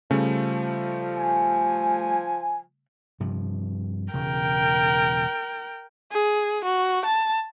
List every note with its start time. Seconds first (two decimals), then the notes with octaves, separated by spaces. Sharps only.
0.11 C#3 F3 G3 A3
1.17 G#5
3.20 G2 C3 F3
4.14 E1 C#3 A#4 G5
6.11 G#4
6.64 F#4
7.05 A5